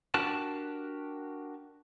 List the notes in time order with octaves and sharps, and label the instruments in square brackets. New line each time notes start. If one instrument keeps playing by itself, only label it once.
[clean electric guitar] D4 F#4 G4 A#4 A5